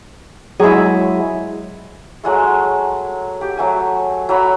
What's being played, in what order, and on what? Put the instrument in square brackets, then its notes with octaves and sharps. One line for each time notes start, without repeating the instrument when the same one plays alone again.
[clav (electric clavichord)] F#3 G#3 [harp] E4 G#4
[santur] F#3 G#3 A3
G4
F#3 A3 G#5
F#3 E5 B5